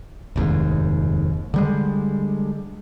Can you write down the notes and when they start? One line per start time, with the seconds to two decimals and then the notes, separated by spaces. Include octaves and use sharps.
0.36 F1 D#2 G#2
1.54 D3 G3 G#3